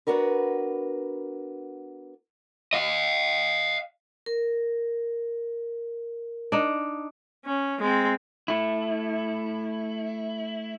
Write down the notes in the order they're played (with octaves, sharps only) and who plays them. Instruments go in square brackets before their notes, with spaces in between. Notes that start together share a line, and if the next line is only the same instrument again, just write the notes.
[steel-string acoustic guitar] B3 D4 F#4 A#4 B4
[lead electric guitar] D#5 F5
[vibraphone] A#4
[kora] D4 D#4
[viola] C#4
G#3 C4
[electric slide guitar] A3 E4